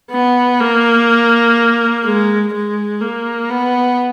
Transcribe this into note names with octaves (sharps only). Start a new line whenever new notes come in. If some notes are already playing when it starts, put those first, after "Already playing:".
B3
A#3
G#3
G#3
A#3
B3